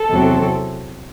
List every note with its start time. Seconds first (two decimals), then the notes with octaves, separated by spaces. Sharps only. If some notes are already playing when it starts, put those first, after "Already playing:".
Already playing: A4
0.09 E2 C3 F#3 C4